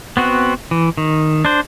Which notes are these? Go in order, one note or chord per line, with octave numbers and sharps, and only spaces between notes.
B3 C4 F#4
E3
D#3
D4 C5